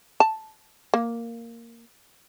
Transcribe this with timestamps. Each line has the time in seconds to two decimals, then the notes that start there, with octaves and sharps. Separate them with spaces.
0.20 A5
0.94 A#3